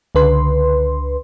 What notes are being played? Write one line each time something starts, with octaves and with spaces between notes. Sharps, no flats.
C#2 D3 B4 C6